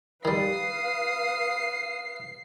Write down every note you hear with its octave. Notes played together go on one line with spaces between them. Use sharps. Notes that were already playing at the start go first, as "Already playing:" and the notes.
D#3 G3 B4 F5 D#6 C7